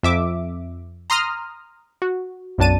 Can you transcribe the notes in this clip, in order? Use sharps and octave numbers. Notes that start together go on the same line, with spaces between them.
F2 E5 D6
A#5 C6 D#6 F6
F#4
B1 F#2 D4 A5 D#7